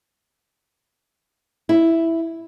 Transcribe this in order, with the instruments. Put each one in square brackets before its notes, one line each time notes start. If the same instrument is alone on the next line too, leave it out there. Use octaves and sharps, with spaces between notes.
[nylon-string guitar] E4